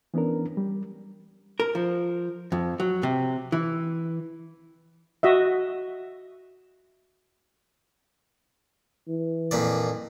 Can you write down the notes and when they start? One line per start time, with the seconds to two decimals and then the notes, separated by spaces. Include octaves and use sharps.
0.14 E3 B3 C#4 D4 A#4
0.57 G3
1.60 A#4
1.75 F3
2.52 F2
2.80 F#3
3.03 C3
3.52 E3
5.23 F#4 D#5 E5
9.08 E3
9.51 F2 A#2 D5